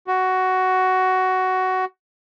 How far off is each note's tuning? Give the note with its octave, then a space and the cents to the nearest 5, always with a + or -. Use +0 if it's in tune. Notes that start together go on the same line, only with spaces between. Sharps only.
F#4 +10